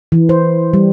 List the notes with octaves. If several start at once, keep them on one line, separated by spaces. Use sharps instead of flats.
E3
C5
G3